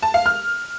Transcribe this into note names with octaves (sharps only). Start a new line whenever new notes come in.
A5
F5
F6